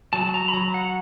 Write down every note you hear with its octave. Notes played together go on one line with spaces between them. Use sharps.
F#3 A5
A#5
B5
F#3 A#5
F#5